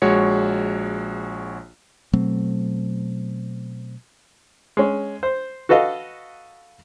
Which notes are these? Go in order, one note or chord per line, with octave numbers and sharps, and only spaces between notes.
A#1 G#3 F#4 C#5 C#7
B2 F#3 A3 C4
G#3 C#4
C5
F#4 A4 B4 D#5 F5